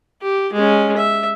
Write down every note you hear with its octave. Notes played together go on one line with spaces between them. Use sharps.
G4
G#3 C#4
E5